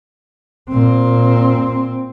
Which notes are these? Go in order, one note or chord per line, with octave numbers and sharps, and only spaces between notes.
A#2 C4